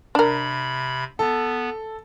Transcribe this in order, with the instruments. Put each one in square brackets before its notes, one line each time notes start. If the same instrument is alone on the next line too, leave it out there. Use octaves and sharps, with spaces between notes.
[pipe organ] C3 B5 [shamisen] D4 A#4
[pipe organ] B3 [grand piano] A4